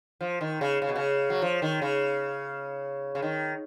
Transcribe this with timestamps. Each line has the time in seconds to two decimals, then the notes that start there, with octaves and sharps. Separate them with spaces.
0.21 F3
0.41 D#3
0.61 C#3
0.82 C#3
0.89 B2
0.96 C#3
1.30 F#3
1.42 F3
1.62 D#3
1.82 C#3
3.15 C#3
3.22 D#3